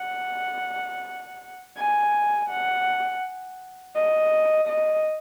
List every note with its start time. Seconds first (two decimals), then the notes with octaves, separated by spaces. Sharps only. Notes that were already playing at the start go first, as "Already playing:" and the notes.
Already playing: F#5
1.77 G#5
2.50 F#5
3.95 D#5
4.68 D#5